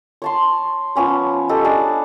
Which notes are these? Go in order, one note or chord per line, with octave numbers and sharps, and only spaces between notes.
C#5 A5 C6
F3 B3 C#4 C#5
G4 A4 D#5
D4 G#4 A4